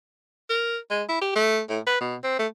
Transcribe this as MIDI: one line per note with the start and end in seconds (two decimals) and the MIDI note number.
0.49 0.77 70
0.90 1.03 56
1.09 1.19 64
1.21 1.34 67
1.35 1.61 57
1.69 1.80 45
1.86 1.99 71
2.01 2.16 47
2.23 2.36 60
2.39 2.47 57